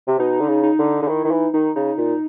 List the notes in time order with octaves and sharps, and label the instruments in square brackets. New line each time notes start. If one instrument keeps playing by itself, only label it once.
[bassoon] C3
[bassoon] B2 [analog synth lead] D#4
[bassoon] D3
C#3
[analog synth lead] D#4
[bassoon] D3
D3
[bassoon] D#3 [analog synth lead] E4
[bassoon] D#3
[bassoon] E3 [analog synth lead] D#4
[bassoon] D#3 [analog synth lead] D#4
[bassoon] C#3 [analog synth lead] D#4
[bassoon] A#2